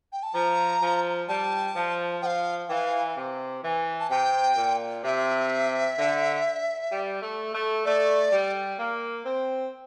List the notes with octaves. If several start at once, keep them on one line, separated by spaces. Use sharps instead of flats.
G5
A5
F3 A#5
F3
G3 A5
F3
F3 F5 G5
E3 F5 G5
C3
E3
A5
C3 G5
A#2
C3 E5
D3
G3
A3
A3
A3 D5
G3
A#3
C4